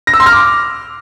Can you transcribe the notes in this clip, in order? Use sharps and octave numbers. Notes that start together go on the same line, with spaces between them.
A#6
E6
C6
F6
D6